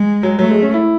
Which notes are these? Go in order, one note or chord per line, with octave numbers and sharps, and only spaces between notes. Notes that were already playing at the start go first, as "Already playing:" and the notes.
Already playing: G#3
F#3
F#3 A3
G#3
C#4
E4